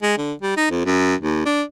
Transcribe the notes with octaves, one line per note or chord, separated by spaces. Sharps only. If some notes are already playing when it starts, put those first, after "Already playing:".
G#3
D3
G3
D#4
F2
F#2
D#2
D4